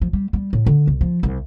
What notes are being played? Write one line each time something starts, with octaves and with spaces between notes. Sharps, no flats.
F3
G3
G3
A2
D3
C2
F3
C2